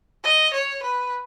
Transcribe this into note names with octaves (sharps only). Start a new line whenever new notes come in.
D#5
C#5
B4